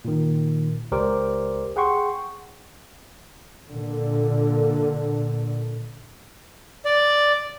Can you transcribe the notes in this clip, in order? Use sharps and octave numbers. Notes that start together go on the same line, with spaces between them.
A#2 D#3
C#2 G4 A#4 C5 D5 D6
G#4 F#5 G5 C6 C#6
A#2 D3
D5